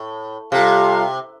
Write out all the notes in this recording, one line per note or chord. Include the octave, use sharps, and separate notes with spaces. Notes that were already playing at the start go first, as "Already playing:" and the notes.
Already playing: A2
C3 G3 F4 A4 F5